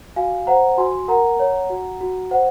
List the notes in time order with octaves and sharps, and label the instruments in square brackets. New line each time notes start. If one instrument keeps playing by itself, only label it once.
[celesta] F#4 F5 G#5
C5 F#5 A#5
F#4 G#5 C6
A#4 F#5 A#5
C#5
F#4
F#4
C5 F#5